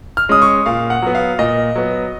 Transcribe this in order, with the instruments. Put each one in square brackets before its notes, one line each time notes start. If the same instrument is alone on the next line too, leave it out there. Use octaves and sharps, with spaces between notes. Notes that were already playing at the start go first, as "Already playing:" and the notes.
[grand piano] F6
G#3 C#4 D#6
C#6
A#2 F5
F#5
F#3 B3
F5
A#2 D#5
F#3 B3